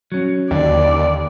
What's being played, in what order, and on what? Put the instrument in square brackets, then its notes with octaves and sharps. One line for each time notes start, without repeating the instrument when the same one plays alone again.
[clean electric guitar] F#3 C#4
[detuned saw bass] D#2 [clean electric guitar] D3 [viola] D5